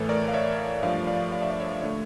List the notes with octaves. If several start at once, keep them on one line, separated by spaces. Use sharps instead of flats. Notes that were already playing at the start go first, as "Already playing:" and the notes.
Already playing: A2 E3 A3 A4 C#5
A#4 D5
F5
C#5 E5
G2 F3 A3 D5 F5
D5 F5
F5
E5
D5
C#5 E5
D3 A3 C#5 E5